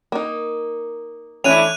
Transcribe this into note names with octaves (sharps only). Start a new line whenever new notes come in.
A#3 D#4
E3 A3 C#4 D4 E4 F#6 D#7 F7